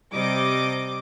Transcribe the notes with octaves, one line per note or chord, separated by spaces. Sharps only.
C3 G3 D#5 D6